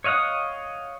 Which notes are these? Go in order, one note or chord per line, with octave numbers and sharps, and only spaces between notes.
C#5 D#5 F5 F#5 D#6